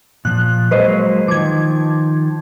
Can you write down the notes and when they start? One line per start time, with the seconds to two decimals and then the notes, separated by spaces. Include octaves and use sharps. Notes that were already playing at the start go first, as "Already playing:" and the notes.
0.25 A#2 F3 F#6
0.71 F#3 G#3 A#3 B4 C5 D#5
1.28 D#3 F3 D6 G#6